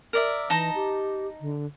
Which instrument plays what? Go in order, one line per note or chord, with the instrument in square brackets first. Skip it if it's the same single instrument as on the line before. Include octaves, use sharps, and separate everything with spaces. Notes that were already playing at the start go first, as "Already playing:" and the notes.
[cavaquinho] A#4 D5 E5
[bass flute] E3 [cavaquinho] D#4 A5 A#5
[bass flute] G4
D3